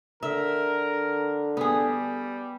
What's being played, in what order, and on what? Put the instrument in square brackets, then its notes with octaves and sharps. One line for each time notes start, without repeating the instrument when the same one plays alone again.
[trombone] D3 [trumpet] A#4 [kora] E5
[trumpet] G3 [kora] B3 G#4